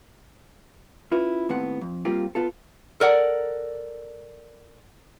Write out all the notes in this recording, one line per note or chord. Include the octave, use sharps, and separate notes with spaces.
C#4 E4 F4 B4
D#2 A2 B3 C4 F#5
F2
G3 A#3 C4 F4 G4
B3 F4 A4
A4 A#4 D5 F#5